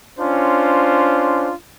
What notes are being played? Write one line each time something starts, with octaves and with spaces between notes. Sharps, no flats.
C#4 D4 F4 C5